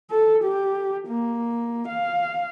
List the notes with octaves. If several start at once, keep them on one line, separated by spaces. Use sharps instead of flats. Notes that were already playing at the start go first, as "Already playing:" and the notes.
A4
G4
A#3
F5